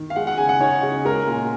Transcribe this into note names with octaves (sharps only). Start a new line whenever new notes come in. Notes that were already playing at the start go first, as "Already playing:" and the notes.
Already playing: D#3
F5
G#3 F#5
F#5
C#3 G#5
F#5
D#4 C#5
C#3
G#3 A#4
A#2